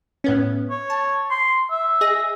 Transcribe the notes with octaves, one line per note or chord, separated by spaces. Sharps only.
A2 B3 C#4
C#5
A5
C6
E5
G#4 D#5 A#6